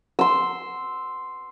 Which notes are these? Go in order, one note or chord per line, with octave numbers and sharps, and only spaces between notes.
C6 E6